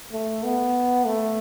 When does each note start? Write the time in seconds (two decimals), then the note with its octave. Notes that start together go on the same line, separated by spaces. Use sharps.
0.12 A3
0.43 B3
1.06 A3